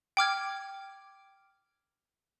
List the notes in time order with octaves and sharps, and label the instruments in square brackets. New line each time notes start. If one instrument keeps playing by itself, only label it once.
[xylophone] G5 D6 F6 G#6